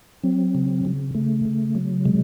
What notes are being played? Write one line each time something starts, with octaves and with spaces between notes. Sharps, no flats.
F#3 C4
C#3
C#3
C#3 A3
C#3
F#3
C3 G#3